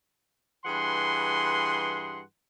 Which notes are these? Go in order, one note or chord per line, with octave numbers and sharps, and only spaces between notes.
G2 E3 G#4 F#5 C6